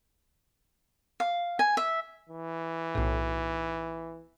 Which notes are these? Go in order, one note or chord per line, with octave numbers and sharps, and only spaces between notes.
F5
G#5
E5
E3
B1 A2